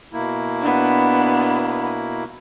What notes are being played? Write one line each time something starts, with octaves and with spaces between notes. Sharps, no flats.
B2 A#3 E4
B3 D4